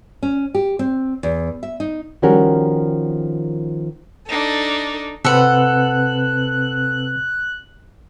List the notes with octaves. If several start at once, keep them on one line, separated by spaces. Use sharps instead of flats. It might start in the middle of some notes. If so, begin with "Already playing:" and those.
C#4
G4
C4
E2
E5
D#4
D#3 F3 G3 C#4 F#4 A#4
D4 D#4 A4
C3 C4 A4 B4 F#5 F#6